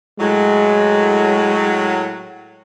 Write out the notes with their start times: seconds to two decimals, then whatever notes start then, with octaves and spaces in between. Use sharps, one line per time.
0.20 A2 F#3 G#3